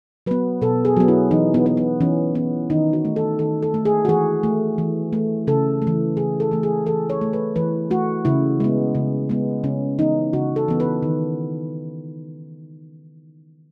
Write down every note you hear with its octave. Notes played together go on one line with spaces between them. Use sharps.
F#3 B3 B4
B2 A4
G#4
F#3 B3
E4
E3 D#4
B3
B3
B3
E3 C#4
B3
D#3 D#4
F#4
A3
A4
D#3 A4
A4
A3
G#4
F#4
E3 G#4
A3
E3
A3
C#3 A4
A3
E3
C#3 G#4
A4
E3 A3
G#4
E3 A4
C#5
A3
B4
E3 B4
A3 F#4
C#3 E4
G#3 B3
C#3
G#3 B3
C#3 C#4
E3 B3 D#4
C#3 F#4
A4
E3 B3
B4
D#3